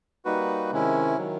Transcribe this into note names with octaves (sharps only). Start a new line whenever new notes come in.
G3 A#3 D#4 F#4 B4
C3 D#3 G#3 C#4 E4
D#3 F#3